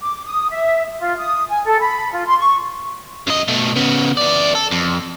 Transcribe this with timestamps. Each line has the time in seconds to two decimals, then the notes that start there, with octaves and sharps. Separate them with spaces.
0.01 D6
0.25 D#6
0.50 E5
0.99 F4
1.17 D#6
1.49 G#5
1.65 A4
1.80 B5
2.12 F4
2.26 C6
2.38 C#6
3.27 F#2 D#5
3.48 B2 A3
3.76 C#3 B3
4.17 E3 D5
4.55 A4
4.71 F2